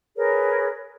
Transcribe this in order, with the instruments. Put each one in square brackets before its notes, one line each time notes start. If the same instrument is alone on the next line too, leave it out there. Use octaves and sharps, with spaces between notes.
[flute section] G#4 A#4 B4 C#5